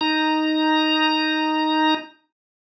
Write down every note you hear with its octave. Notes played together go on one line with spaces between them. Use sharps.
D#4 A#5